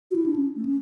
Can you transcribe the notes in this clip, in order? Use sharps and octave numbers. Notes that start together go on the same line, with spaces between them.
F#4
E4
D4
C#4
A3
C#4